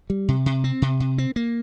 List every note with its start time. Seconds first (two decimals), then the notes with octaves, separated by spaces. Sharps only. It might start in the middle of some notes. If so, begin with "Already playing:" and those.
0.10 G3
0.28 C3
0.46 C3
0.64 C4
0.82 C3
1.00 C3
1.18 C4
1.36 A#3